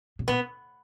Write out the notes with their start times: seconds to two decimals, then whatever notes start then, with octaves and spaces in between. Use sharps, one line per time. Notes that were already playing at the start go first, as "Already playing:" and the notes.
0.19 B2
0.28 A#2 B3